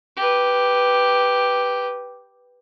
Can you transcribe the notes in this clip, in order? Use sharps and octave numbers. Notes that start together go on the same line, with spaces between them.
G4 B4